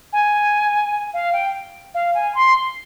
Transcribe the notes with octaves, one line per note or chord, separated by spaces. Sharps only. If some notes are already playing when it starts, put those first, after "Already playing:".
G#5
F5
G5
F5
G#5
C6